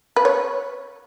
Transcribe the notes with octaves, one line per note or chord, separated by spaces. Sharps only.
B4
C#5